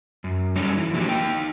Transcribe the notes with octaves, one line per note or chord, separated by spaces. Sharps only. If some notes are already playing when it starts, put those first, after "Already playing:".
F#2
G3 C#4 D#4 F#4 A4 C#5
E3 E4
F3 A3 A#3 D4 F#4 G4
A#3 D#4 G5